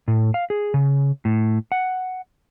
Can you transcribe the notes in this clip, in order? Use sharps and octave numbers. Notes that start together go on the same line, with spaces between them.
A2
F5
G#4
C#3
A2
F#5